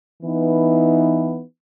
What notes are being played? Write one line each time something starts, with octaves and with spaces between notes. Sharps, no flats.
E3 B3 D#4